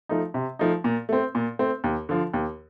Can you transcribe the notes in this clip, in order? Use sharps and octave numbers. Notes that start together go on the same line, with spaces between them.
F3 A3 D#4
C3
F3 A3 D#4
A#2
A3 C4
A#2
A3 C4
D#2
D3 F3
D#2